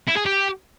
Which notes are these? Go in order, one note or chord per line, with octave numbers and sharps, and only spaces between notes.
E4
G#4
G4